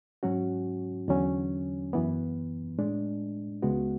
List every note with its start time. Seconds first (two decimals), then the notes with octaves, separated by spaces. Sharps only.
0.23 G#2 F#3 C#4 F#4
1.08 E2 D3 F#3 C#4
1.93 F#2 E3 B3
2.78 A2 G#3 D4
3.62 C#2 C#3 G#3 B3 F#4